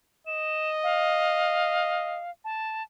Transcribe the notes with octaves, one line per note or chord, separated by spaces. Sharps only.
D#5 E7
F5
A5